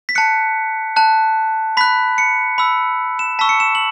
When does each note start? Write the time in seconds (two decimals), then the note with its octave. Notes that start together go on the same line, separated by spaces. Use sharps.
0.09 B6
0.15 A5 F#6 C#7
0.96 A5 F#6
1.77 B5 F#6 B6
2.18 C#7
2.58 B5 E6
3.19 E7
3.39 A5 C#6 E6 B6
3.49 C#7
3.60 E7
3.75 F#7